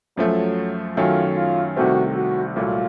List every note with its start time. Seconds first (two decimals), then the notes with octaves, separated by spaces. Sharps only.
0.17 F#2 F3 F#3 A3
0.97 F#2 D#3 F#3 A3 C#4 F4
1.37 F4
1.76 C2 C3 D#3 A3 C4 F#4
2.16 F#4
2.55 C2 A#2 F#3 A3 F4